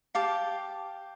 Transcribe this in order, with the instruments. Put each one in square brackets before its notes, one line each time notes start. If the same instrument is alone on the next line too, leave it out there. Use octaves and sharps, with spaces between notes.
[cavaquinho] G4 F5 A5 D6